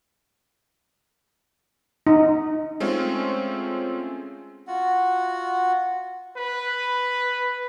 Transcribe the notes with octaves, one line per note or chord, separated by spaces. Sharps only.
D#4
G#3 A3 C4 C#4 F4
F4 F#4 F#5
B4